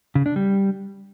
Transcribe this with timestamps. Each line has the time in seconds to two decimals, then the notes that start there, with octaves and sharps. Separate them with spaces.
0.15 C#3
0.26 D4
0.36 G3